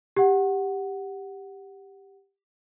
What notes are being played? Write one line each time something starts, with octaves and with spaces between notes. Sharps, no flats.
G4 F#5